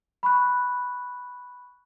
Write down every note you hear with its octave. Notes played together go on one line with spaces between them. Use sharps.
B5 C#6 F#6